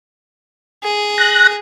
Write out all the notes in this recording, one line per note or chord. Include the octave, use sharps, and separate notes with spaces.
G#4
F#6 A#6